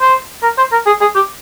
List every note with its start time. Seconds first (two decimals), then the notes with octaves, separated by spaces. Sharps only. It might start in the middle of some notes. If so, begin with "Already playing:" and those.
0.01 C5
0.43 A#4
0.58 C5
0.72 A#4
0.86 G#4
1.01 G#4
1.15 G4